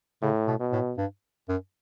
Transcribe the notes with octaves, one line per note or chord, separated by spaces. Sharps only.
A2 C#3
B2
B2
A2
G2
F#2